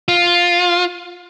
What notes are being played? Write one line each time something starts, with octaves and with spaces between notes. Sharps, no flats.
F4